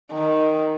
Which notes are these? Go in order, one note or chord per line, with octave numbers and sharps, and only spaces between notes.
D#3